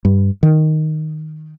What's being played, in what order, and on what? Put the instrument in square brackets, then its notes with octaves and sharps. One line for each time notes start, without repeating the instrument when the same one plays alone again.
[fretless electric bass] G2
D#3